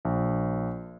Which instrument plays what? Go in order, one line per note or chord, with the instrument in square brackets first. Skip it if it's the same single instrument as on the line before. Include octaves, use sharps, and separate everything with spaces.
[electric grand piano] A#1